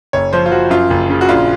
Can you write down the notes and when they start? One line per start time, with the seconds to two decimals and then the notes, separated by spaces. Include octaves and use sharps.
0.13 F#1 C#5
0.33 F3 C5
0.46 F4
0.51 F3 F#4
0.70 F#2 F4
0.90 F#1
1.10 C#3
1.21 F#4
1.28 A#1 F4